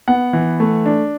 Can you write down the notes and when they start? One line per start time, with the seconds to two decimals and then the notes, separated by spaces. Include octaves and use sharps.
0.08 B3 F#5
0.33 E3
0.60 A3
0.85 D4